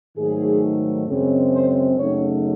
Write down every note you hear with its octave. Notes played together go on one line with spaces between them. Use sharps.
G#2 D#3 F#3 A3 G#4
F#2 C#3 G#3 C4
C5
F#2 C#3 F#3 A3 D#4 C#5